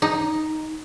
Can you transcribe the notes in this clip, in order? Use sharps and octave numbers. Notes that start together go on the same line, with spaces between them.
D#4